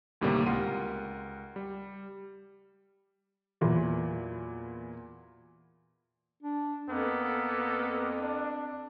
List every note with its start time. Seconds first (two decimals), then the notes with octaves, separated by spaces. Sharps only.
0.21 D2 A2 C3 D#3 G3 A#3
0.46 C#2 A#4 F#5 C6 D#7
1.56 G3
3.61 E2 A#2 E3 F#3
6.43 D4
6.90 F2 A#3 B3 A4
8.19 D4